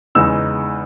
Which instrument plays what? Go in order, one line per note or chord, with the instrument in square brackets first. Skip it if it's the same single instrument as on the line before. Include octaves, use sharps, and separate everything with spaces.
[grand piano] E2 C#3 G#3 B3 D#4 E6